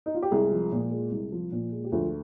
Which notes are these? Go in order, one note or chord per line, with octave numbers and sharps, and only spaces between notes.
D#4
F4
G4
C2 G#3 G#4
F3
A#2
G#3
C2
F3
A#2
G#3
G4
D2 F3 F4